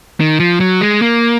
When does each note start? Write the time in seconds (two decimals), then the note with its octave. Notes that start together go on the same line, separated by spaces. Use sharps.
0.20 D#3
0.40 F3
0.60 F#3
0.81 G#3
1.02 A#3